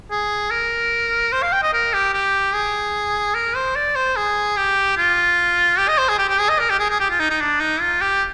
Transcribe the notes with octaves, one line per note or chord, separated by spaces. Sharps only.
G#4
A#4
C5
F5
G5
D#5
A#4
G4
G4
G#4
A#4
C5
D5
C5
G#4
G4
F4
G4
D#5
C5
G#4
G4
G4
G#4
D#5
A#4
G4
G#4
G#4
G4
F4
D#4
D#4
D4
D#4
F4
G4